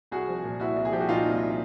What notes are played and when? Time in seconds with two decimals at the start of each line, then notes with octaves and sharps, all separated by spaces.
0.11 C2 F#4 G#4
0.28 F3
0.44 A#2
0.60 C2 E4 F#4
0.76 C2
0.85 G#4
0.92 F3 G4
1.00 F#4
1.09 A#2 D#4 F4
1.26 C2